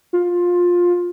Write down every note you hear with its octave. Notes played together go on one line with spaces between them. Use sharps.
F4